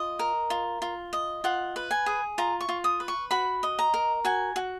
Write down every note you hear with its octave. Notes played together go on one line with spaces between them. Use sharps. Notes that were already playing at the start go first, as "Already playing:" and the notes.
Already playing: F4 D#5
A#4
F4
F4
D#5
F4 F#5
B4
G#5
G#4
F4 A#5
C#6
F4
D#6
B4
C#6
F#4 B5
D#5
A#5
A#4
F#4 G#5
F#4